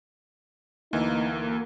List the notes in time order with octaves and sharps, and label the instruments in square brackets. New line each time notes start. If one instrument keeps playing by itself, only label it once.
[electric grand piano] D2 E3 [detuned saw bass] A#3 [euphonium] D#4